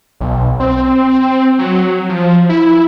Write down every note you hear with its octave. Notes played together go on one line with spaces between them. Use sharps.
B1
C4
F#3
F3
E4